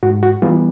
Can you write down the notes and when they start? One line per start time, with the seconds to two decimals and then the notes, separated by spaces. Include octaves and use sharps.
0.03 G#2 F#4
0.23 F#4
0.42 E3 G3 B3 F4